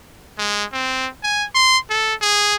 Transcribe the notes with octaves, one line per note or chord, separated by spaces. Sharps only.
G#3
C4
G#5
C6
A4
G#4